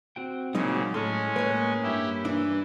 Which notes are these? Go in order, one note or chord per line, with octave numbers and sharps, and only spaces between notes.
C4 F#4 G5
A#2 C#3 F#3 G#3 D#4
A2 G#3 C#4 A4 C6 F6
A2 A#3 B4 C#5 F#6
G2 E4 G4
E3 D4 E4